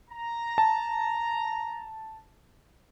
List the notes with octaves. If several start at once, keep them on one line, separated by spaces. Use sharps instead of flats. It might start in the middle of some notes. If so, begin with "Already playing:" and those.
A#5
A5